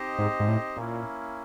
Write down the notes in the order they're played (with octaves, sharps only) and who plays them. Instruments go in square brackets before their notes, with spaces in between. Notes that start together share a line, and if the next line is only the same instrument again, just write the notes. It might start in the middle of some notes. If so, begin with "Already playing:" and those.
Already playing: [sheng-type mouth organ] C4 D#4 G4 C5 D#5
[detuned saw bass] G#2
G#2
A2
[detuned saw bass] A#2 [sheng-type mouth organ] A#3 C#4 E4